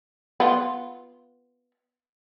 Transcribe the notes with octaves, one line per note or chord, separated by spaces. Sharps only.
B3 F4